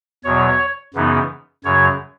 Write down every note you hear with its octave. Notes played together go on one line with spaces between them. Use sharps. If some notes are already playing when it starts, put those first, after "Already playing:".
E2 B2 F#3 C#5
F#2 C#3 E3 B3 D#4
F#2 C#3 F#3 C#5